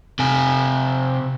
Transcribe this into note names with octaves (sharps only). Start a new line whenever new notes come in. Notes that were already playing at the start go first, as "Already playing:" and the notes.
C3 G#5